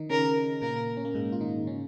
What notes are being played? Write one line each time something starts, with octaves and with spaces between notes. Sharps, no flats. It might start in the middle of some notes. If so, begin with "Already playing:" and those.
Already playing: D#3 D#4
C#3 C#4 A#4
A#2 A#3 A#4
C#4
A#3
G#2 G#3
F4
D#3 D#4
C#3 C#4